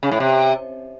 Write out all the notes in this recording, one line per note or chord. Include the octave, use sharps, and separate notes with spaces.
C#3
A2
C3